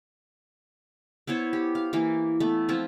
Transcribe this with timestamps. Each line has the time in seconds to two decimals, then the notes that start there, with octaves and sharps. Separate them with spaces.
1.27 B3 E4 C5 C#5
1.53 G4
1.75 F5
1.93 E3 A#3
2.40 A3 B3
2.69 F3 C4 E4 F4